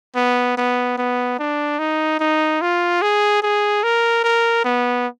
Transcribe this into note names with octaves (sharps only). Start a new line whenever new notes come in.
B3
B3
B3
D4
D#4
D#4
F4
G#4
G#4
A#4
A#4
B3